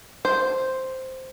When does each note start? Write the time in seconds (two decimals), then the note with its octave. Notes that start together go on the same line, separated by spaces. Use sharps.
0.25 C5